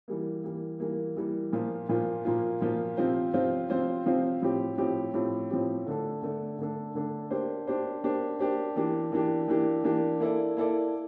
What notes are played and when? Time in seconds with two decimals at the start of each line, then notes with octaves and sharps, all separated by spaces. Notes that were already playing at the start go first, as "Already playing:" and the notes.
0.08 E3 G3 A#3
0.44 E3 G3 A#3
0.80 E3 G3 A#3
1.17 E3 G3 A#3
1.52 A#2 F3 A#3 F4
1.89 A#2 F3 A#3 F4
2.25 A#2 F3 A#3 F4
2.61 A#2 F3 A#3 F4
2.97 C3 F3 C4 F4 C5
3.33 C3 F3 C4 F4 C5
3.70 C3 F3 C4 F4 C5
4.06 C3 F3 C4 F4 C5
4.42 A2 F3 C4 G4
4.78 A2 F3 C4 G4
5.14 A2 F3 C4 G4
5.50 A2 F3 C4 G4
5.86 D3 A3 D4 A4
6.22 D3 A3 D4 A4
6.59 D3 A3 D4 A4
6.95 D3 A3 D4 A4
7.31 A#3 D4 G4 C5
7.67 A#3 D4 G4 C5
8.03 A#3 D4 G4 C5
8.39 A#3 D4 G4 C5
8.76 E3 A#3 D4 G4
9.12 E3 A#3 D4 G4
9.48 E3 A#3 D4 G4
9.84 E3 A#3 D4 G4
10.20 A#3 E4 A4 D5
10.57 A#3 E4 A4 D5